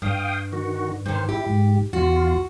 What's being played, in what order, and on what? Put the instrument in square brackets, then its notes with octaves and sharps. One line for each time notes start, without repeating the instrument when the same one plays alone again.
[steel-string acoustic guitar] G2 [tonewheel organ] F5 G5 D#6
[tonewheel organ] D#3 F#4
[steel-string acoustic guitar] G2 D#3 [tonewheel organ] C5
[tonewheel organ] E4 [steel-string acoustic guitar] G4
[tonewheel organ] G#2
[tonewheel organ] E2 F4 [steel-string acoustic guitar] F#4